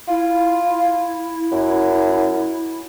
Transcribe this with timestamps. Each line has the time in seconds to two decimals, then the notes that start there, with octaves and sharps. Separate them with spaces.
0.08 E4 F4
1.51 F#2